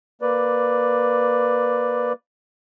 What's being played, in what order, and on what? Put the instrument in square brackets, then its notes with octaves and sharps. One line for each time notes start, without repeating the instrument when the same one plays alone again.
[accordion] A#3 B4 D5